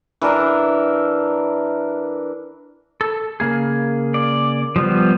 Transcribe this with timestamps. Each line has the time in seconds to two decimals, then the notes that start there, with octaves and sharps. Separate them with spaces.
0.21 E3 D4 A#4 E5
3.01 A4
3.40 C#3 A#3 G#4
4.14 D5
4.76 F3 G3 B3